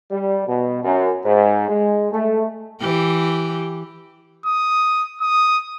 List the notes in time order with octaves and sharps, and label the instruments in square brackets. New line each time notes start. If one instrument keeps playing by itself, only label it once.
[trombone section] G3
B2
F#2
G#2
G#3
A3
[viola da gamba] E3 G4
[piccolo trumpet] D#6
D#6